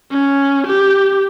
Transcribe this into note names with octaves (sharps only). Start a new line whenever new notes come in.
C#4
G4